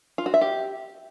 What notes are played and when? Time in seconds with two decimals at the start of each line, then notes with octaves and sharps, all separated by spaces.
0.18 F4
0.26 F#4
0.34 E5
0.41 G4